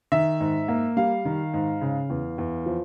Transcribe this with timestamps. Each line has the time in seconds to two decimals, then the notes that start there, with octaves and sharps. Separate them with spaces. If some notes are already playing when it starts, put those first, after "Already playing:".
0.12 D#3 E5
0.40 G#2
0.68 A#3
0.97 G3 F5
1.25 D#3
1.53 G#2
1.81 C#3
2.10 E2
2.38 E2
2.66 F3